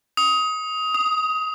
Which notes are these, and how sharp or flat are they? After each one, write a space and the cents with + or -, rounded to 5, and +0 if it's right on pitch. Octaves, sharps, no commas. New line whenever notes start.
D#6 +20
D#6 +0